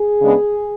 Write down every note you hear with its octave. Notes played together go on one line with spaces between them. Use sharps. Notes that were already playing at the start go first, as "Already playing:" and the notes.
Already playing: G#4
C#3 G#3 B3 D4